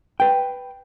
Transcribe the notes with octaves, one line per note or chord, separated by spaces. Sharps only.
B4 G5